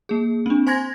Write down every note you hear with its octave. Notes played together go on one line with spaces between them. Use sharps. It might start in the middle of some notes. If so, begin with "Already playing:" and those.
A#3 G#4
C4 D4
C5 G#5 C6 G#6 A#6